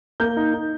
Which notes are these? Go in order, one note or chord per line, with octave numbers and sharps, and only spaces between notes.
A#3 G6
D#4
D#4